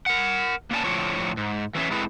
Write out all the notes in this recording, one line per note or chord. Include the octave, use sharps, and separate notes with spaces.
A#4 F#5
A#3 B3 C#4 D5 G#5 A5
A2 F3 D4 F4 C#5
G#2
E3 F#3 C#4 C#5 E5
G#3 A3 C4 E4 G#4 B4